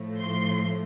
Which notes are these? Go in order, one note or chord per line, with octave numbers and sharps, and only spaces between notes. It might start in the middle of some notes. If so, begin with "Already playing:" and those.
Already playing: A2 F3 A3
C6